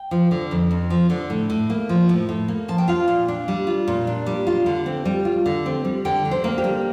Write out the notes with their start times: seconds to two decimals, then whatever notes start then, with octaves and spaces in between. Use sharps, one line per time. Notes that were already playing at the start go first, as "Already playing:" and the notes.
Already playing: G5
0.11 F3
0.31 D3
0.51 F2
0.71 F2
0.90 F3
1.10 D3
1.30 A2
1.50 A2
1.70 A#3
1.89 F3
2.09 A2
2.29 A2
2.48 A#3
2.68 F3 A5
2.78 G5
2.88 F4 F5
3.08 A#2
3.28 D4
3.48 G3
3.67 F4
3.88 A#2
4.07 D4
4.26 G3
4.47 F4
4.66 D3
4.86 C4
5.05 G3
5.25 F4
5.46 D3
5.66 C4
5.85 G3
6.05 D3 G5
6.25 D3
6.31 C5
6.44 A#3
6.58 G4
6.64 G3